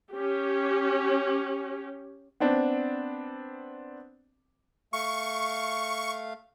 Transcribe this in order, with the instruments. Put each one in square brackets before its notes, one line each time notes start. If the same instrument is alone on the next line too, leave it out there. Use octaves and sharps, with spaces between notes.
[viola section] C#4 G4
[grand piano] B3 C4 D4
[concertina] A3 F5 [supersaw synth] C#6